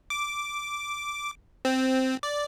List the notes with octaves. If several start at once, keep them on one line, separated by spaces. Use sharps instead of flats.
D6
C4
D5